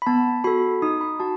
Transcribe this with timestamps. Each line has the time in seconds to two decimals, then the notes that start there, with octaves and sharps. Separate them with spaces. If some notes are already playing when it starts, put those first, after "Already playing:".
0.02 B5
0.06 B3 A5
0.44 F#4 A4 B5
0.82 D#4 D#6
1.01 B5
1.20 F#4 A5